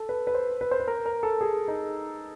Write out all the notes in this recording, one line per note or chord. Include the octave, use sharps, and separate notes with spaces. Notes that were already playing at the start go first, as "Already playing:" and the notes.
Already playing: A4
B4
B4
C5
B4
C5
B4
A#4
A#4
A4
G#4
D#4